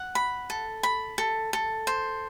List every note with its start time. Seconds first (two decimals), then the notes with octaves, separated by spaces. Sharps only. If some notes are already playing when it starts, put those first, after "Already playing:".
Already playing: F#5
0.15 B5
0.50 A4
0.83 B5
1.18 A4
1.53 A4
1.87 C5